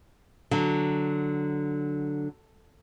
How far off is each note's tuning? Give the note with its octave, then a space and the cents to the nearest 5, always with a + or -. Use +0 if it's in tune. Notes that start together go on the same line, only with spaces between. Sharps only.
D3 +0 F#3 +0